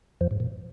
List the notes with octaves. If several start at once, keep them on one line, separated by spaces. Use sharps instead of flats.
F2 F3
G#2
A#2